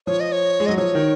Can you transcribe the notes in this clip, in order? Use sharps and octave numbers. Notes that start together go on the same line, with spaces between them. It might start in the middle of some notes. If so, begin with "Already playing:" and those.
F3 C#5
D#5
C#5
G#3
F#3 D#5
F3 C#5
D#3